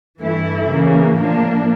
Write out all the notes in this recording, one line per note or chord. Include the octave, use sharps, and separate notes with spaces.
G2 E3 A3 E4
C#3 E3 A#3
A2 F3 A#3 D4